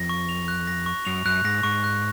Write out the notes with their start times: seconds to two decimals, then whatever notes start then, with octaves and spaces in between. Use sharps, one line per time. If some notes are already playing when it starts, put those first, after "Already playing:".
Already playing: F2 A#6
0.09 C#6
0.29 F7
0.48 F#6
0.67 A#6
0.86 C#6
1.05 F#2 F7
1.25 F#2 F#6
1.44 G#2 A#6
1.63 G#2 C#6
1.84 F#6